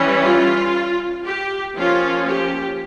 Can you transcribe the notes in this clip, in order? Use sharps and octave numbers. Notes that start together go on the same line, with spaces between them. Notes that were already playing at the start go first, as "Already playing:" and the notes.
Already playing: E3 G3 C#4
F4
G4
F3 A#3 C#4 F4
G4